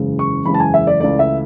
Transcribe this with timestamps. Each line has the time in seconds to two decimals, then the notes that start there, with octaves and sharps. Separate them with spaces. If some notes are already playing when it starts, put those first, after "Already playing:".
Already playing: F#1 E2 C#3 G#3
0.19 C#6
0.46 F#1 E2 C#3 G#3 B5
0.54 A5
0.60 G#5
0.74 E5
0.87 D5
1.00 C#2 C#3 E3 A3 D5
1.19 E5